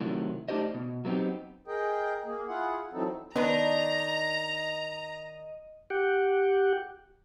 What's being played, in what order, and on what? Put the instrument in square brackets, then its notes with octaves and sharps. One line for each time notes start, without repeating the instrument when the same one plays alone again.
[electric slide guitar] A2 C3 D#3 F#3
A3 D4 D#4 G4 C5 D#5
B2
F#3 A3 B3 C4 D#4 G4
[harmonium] G#4 A#4 D#5 G5
A#3 G#4
E4 F4 G#4 F#5
E3 F#3 C4 D#4 A4
[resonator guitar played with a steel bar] D#3 D4 [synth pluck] B3 B4 [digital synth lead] D#5 [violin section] A#5
[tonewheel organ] G4 F#5 G5